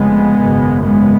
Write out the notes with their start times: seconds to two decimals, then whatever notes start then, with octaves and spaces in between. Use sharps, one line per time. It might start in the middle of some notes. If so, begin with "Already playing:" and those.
Already playing: F1 F2 C#3 G#3 B3
0.37 G#1 F#2 C#3
0.85 G#3 B3